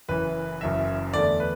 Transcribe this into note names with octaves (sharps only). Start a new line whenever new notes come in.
F#1 F#2 E3 B4
F#1 F#2 E3 E5
E2 D3 A3 D5
B4